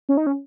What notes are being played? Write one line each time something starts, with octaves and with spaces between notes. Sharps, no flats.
C#4
D#4
C#4